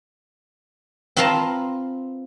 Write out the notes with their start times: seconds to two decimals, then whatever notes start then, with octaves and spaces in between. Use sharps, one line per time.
1.16 C4 F4 B4 F5 A5 A#5